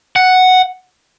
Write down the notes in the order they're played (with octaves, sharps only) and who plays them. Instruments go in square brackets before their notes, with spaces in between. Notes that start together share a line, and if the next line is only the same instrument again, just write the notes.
[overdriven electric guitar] F#5